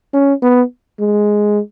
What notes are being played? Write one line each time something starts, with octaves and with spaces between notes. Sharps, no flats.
C#4
B3
G#3